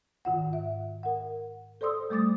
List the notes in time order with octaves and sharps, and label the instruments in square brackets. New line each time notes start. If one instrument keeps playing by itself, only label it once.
[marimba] G#2 D#3 F4 F#5
E5
A#4 F#5
A4 C5 D5 C6 D#6 E6
G3 A3 D6 D#6 A6